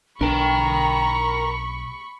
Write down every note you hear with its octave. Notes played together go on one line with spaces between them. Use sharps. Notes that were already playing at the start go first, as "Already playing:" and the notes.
B1 D4 A#4 G5 A#5 B5 C#6